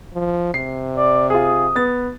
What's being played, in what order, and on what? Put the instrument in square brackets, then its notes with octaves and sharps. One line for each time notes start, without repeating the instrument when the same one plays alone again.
[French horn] F3
[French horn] C3 [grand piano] C7
[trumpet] D5
[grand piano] F4 G#4 [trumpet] D#6
[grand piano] B3 A6